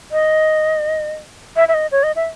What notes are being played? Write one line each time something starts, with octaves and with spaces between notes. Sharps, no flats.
D#5
E5
E5
D#5
C#5
D#5
E5